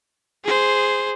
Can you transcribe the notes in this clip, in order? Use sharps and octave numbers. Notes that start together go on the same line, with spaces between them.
G#4 C5